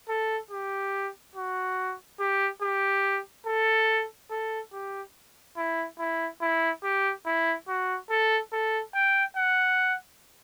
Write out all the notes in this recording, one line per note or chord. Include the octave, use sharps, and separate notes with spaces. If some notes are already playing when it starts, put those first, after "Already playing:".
A4
G4
F#4
G4
G4
A4
A4
G4
E4
E4
E4
G4
E4
F#4
A4
A4
G5
F#5